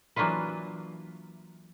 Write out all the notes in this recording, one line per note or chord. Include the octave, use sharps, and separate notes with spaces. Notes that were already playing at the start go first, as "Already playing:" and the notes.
E3 F#3 A#3 D4 F4 B4